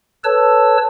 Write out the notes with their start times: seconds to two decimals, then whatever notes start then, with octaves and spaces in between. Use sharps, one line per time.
0.24 A4 B4 C#5 A5 E6